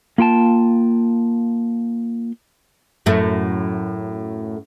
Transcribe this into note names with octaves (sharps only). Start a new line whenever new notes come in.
A#3 F4 G5 A5
F#2 A2 A3